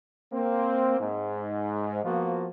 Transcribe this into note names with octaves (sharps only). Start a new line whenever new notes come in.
A#3 C4
G#2
F3 A#3 B3 F4 F#4